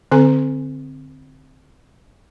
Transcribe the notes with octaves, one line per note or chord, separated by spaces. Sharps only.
D3 C4 A4 G#5